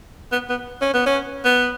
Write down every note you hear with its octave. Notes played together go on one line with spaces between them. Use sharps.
B3
B3
C#4
B3
C#4
B3